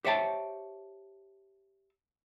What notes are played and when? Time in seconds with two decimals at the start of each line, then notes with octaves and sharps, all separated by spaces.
0.04 G4 C5 C#5 E5 G5 A5